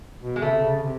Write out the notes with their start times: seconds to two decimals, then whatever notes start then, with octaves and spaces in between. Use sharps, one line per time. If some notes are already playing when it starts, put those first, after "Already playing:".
0.21 B2
0.36 G#3
0.42 C#3 A3
0.51 C3
0.61 C#3
0.76 C#3
0.83 C3